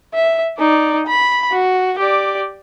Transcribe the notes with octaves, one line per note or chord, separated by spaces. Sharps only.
E5
D#4 D5
B5
F#4
G4 D5